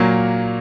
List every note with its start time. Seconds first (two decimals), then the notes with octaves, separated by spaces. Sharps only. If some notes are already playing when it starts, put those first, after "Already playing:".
Already playing: A#2 F#3 A#3